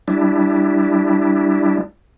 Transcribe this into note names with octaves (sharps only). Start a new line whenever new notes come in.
G3 D4 E4